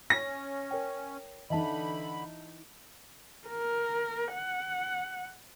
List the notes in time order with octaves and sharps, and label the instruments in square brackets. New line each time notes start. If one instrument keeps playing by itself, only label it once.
[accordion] C#4 [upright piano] A#6
[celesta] A#4 C#5 G5
[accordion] D3 B5 [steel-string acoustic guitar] E3 D#4 [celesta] D#5 E5 A5
[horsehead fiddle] A#4
F#5